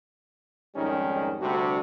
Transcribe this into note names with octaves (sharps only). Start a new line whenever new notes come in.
F2 G#2 D#3 G3 C#4
D2 C3 G3 D4 F#4